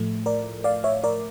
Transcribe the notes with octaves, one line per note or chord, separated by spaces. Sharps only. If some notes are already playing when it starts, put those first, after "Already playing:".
Already playing: A2 F3 A3
A#4 D5
D5 F5
C#5 E5
A#4 D5